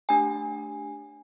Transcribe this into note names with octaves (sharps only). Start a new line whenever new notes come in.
A3 D4 G4 G#5